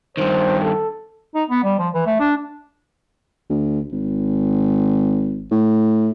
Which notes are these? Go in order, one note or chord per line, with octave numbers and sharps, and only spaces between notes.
G2 D#3 C5
A4
D#4
B3
G3
F3
E3
A3
D4
D2
G#1
A2